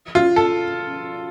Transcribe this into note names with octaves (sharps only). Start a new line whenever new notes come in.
F4
A4